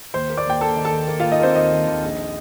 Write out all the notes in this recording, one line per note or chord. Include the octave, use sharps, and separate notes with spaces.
D#2 C5 C6
A#3
D5 D6
D#2 G5
A#3 A4 A5
D#3
A4 A5
D#2
A#3
F4 F5
A#3
D#4 D#5
A#3 C4 C5
D#2 D#4 D#5
D#2
D#2
A#1